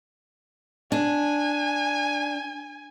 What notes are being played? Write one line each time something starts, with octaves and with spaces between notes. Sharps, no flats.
D4 G#5